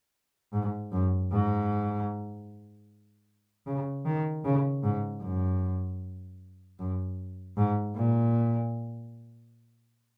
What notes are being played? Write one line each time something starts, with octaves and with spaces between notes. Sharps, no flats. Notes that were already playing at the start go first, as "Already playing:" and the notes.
G#2
F#2
G#2
C#3
D#3
C#3
G#2
F#2
F#2
G#2
A#2